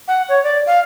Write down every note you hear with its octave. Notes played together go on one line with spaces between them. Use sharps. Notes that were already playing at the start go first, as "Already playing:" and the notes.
F#5
C#5
D5
F5